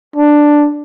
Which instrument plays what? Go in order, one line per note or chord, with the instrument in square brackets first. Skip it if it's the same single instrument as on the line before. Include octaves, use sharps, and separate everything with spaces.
[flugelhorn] D4